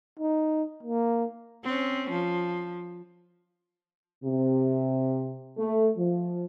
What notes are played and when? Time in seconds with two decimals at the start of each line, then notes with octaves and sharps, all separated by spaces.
0.19 D#4
0.83 A#3
1.64 C4 C#4
2.10 F3
4.24 C3
5.57 A3
5.97 F3